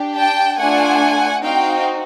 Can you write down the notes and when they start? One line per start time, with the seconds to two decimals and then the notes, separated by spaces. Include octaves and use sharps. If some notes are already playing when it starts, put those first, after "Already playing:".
Already playing: D4 G4
0.16 G5 A5
0.58 A3 D4 F4 F#5 G#5
1.43 C4 D#4 F#4 F5 G5